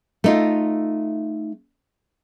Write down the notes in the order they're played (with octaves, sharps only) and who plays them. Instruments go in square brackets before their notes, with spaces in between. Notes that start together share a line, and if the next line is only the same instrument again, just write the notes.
[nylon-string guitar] A3 D#4 F4